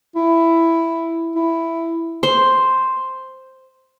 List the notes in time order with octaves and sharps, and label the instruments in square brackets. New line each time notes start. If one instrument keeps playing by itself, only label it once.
[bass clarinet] E4
E4
[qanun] C5 C6